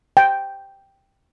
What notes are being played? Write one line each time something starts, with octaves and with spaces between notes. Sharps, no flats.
G5